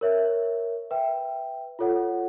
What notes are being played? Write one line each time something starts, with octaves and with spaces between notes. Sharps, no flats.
A#4 C#5 E5
B4 E5 G5
F4 A4 C#5 F#5